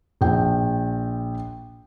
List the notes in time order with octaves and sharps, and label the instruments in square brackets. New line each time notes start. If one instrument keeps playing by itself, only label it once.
[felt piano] A#1 G5